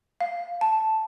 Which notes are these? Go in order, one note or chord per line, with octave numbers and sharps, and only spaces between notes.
F5
A5